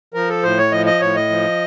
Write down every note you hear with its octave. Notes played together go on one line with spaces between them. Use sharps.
F3 A#4
A4
A2 C5
C#5
F3 D#5
D#5
A2 C#5
D#5
F3